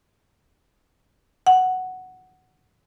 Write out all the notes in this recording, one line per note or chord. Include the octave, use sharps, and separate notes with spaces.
F#5